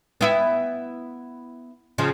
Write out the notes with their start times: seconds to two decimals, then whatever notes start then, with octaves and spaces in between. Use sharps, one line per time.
0.21 B3 E4
1.98 C#3 F3